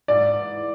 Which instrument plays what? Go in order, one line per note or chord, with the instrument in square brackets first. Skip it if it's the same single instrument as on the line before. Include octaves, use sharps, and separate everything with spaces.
[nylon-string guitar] G#2 [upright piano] D5
[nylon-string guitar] E3